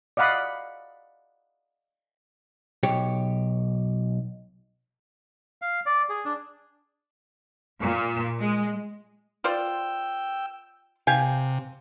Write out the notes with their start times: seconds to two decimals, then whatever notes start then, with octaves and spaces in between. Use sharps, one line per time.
0.17 D5 D#5 F5 F#5 B5 D#6
2.83 B1 G4 C#5
5.62 F5
5.86 D5
6.09 G#4
6.25 D4
7.81 A#2
8.40 G#3
9.44 F4 C5 D5 G5 E6
11.07 C3 G4 F5 G#5